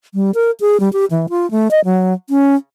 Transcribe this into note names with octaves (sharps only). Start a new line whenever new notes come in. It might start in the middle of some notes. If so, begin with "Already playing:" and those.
G3
A#4
G#4
G3
G4
E3
F4
A3
D#5
F#3
C#4